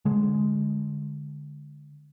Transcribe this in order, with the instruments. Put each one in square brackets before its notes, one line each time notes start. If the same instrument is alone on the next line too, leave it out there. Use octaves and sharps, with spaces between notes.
[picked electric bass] D3 G#3